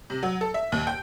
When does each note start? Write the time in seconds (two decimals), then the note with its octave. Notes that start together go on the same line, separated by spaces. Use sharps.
0.10 C3
0.23 F#3
0.41 A4
0.54 E5
0.72 D#2
0.87 G5